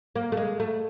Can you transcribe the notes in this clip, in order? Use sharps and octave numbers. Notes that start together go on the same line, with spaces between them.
A#3
A3
G#3
A3